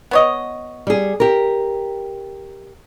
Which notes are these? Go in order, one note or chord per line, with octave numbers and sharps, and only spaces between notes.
B3 C#5 D#5
G3 G#4
G4 A#4